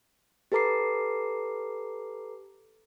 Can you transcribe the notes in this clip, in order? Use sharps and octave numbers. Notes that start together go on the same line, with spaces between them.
G4 A4 B4 A#5 D6 C7